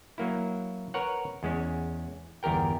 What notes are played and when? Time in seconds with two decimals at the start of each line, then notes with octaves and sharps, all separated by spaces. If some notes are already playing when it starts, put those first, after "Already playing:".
0.18 F#3 A#3 E4
0.94 A#4 B4 C#5 F#5
1.43 E2 G#3 C#4
2.43 G1 E2 G4 A#4 G5